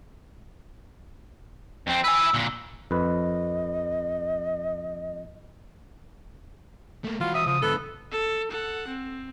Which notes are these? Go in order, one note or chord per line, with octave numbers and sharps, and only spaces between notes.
F2 C4
B4 G#5 E6
A#2 D3
F2 B4 D#5
A3 A#3
E3 F4 F#4
E5 D#6
C#3 F3 D#6
G#2 D3 B3 A4
A4
A4 F#5
C4